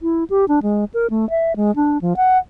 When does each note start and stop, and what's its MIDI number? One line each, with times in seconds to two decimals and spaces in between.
0.02 0.24 64
0.30 0.45 67
0.48 0.60 62
0.63 0.85 56
0.94 1.07 70
1.10 1.28 57
1.30 1.56 76
1.56 1.74 56
1.76 2.00 62
2.01 2.14 53
2.17 2.38 78